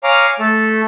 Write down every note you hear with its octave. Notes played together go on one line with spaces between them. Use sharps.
C#5 F5 G#5 A#5 D6
A3 A4